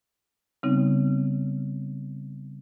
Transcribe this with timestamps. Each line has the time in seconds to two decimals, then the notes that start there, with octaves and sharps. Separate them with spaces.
0.63 C#3 G3 B3 C4 D#4